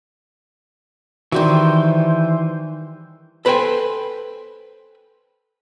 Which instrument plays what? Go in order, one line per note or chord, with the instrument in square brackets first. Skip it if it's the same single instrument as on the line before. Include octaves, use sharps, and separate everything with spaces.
[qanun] D#3 G3 F#4 [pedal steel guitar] E3 C5
[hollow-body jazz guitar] A4 B4 C5 D#5 G5 G#5